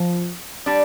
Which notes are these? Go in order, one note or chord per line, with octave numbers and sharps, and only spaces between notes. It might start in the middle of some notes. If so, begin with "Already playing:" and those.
Already playing: F3
G3 D4